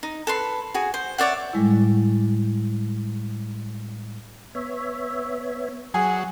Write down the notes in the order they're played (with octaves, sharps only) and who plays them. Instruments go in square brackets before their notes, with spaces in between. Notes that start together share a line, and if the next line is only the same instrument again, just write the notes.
[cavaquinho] D#4
A4 B4 C6
F#4 G#4
C5
C#5 D5 E5 F#5
[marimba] A2 G3 G#3 E4
[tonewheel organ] B3 C#5 E5
[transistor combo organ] F#3 [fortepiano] G#4